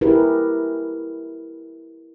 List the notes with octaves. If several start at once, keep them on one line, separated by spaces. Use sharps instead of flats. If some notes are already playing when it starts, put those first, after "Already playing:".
E4 G4 G#4 A#4 B4